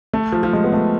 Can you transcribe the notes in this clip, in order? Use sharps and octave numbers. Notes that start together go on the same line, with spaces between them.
A3
F3
F3
G#3
B3
A3